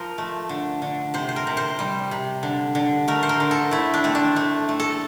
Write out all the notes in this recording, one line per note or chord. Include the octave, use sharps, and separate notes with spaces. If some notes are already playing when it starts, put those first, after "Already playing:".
Already playing: F3 A#4 C5
A3
D3
D3
C3 C5
C5
A#4
C3
C5
G3
C3
D3
D3
A3 A#4
C5
A#4
D3
A4
A3 E4
D4
A3 C4
D4
A3
A3
A4